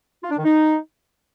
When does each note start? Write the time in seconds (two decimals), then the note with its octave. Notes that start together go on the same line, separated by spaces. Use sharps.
0.22 F4
0.30 D4
0.37 D#3
0.44 D#4